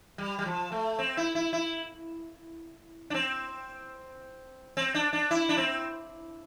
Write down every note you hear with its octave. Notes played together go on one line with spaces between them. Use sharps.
G3
G3
F3
A3
C4
E4
E4
E4
D4
C4
C4
D4
D4
E4
D4
C4